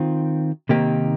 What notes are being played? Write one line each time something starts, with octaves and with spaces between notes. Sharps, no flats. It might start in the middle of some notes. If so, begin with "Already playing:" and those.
Already playing: D#3 C4 F4
C3 D#3 A#3 D#4 G4